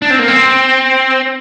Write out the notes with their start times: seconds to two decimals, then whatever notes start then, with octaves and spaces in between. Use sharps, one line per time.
0.02 D4
0.10 C4
0.19 A#3
0.28 C4